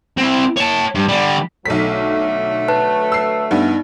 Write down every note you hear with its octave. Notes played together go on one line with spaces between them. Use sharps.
C4 E4
C#5 A5
G2
D3 G3
B1 D3 F#3 A3 B6
B4 A5 F#6
E6 C7
G2 B3 D#4